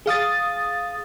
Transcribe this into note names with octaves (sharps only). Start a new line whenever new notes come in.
G#4 F5 D#6 A6